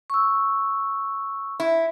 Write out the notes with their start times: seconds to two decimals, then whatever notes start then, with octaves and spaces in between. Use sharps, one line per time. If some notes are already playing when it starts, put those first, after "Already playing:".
0.10 C#6 E6
1.60 E4